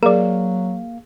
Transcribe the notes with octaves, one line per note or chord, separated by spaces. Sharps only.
F#3 A#3 G#4 A#4 D5 F5